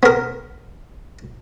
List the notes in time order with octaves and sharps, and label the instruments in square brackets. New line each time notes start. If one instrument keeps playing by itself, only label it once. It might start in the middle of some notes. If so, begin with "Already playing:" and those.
[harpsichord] B3 A#4